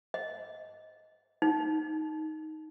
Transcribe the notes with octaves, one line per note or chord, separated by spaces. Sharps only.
D#5
D#4